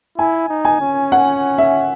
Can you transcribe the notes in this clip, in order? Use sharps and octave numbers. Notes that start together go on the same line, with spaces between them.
E4 G#5
D#4
G#5
C#4
F#5
E5